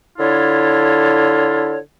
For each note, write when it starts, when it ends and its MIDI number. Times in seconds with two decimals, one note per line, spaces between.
0.19 1.78 50
0.19 1.78 64
0.19 1.78 65
0.19 1.78 69
0.19 1.78 73